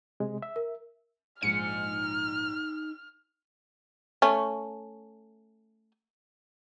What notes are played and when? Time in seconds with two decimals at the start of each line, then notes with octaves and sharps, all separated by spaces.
0.20 C3 G#3
0.42 E5
0.56 A#4
1.42 A#1 G#2 D#4 G#5 F6 C#7
4.22 A3 C#4